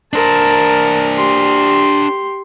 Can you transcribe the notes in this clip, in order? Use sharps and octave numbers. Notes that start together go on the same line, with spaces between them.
D4 A#4 C5 A5
G4 C6